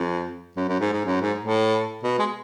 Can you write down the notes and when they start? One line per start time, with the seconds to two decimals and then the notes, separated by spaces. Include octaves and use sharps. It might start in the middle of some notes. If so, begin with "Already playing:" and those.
Already playing: F2
0.56 F#2
0.69 F#2
0.80 G#2
0.93 G#2
1.06 F#2
1.21 G#2
1.38 A2
2.03 B2
2.19 G#3